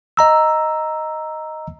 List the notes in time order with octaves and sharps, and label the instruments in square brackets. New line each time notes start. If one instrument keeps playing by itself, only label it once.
[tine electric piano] D#5 A#5 E6